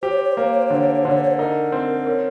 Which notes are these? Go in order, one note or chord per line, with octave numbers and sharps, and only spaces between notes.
G4 C5
C#5
C5
C#5
C5
A#3 C#5
C5
C#5
C5
C#5
D3 C5
C#5
C5
C#5
C5
D3 C#5
C5
C#5
C5
D#4 A#4
C4
C#4